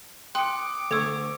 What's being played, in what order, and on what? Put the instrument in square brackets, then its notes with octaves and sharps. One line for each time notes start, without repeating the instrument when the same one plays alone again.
[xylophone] G5 C6 F#6 [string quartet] D6 [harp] D#6 C#7
[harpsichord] D2 [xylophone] A4 E6 [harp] C#6 G#6